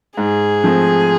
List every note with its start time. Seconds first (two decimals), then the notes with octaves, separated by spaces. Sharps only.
0.18 G#2 G#4
0.64 F3 A3 C4